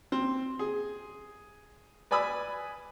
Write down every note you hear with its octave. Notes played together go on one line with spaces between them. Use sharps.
C4
G#4
B4 D5 G#5 B5 D#6 E6